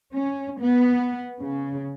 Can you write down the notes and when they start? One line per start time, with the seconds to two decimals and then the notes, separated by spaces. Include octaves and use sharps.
0.13 C#4
0.59 B3
1.42 C#3